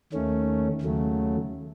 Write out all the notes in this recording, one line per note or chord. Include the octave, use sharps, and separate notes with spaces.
D#2 D#3 A3 C#4
D#2 C#3 F#3 A3